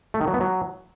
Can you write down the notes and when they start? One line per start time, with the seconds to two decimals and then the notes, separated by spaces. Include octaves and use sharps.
0.14 A3
0.21 D#3
0.27 F#3
0.34 B3
0.40 F#3